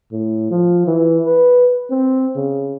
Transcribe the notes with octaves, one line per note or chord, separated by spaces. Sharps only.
A2
F3
E3
B4
C4
C#3